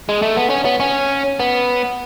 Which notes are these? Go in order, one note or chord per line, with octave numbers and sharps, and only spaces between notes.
G#3
A3
B3
C#4
B3
C#4
B3